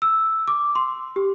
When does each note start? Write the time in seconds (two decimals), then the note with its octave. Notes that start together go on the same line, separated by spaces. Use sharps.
0.02 E6
0.48 D6
0.75 C6
1.16 G4